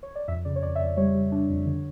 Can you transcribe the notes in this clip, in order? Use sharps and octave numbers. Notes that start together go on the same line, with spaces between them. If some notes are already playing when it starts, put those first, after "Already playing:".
C#5
D5
F2 E5
C#3 D5
C#5
F2 D5
E5
F2 D5
G3 C#5
G3
D4
F2
D3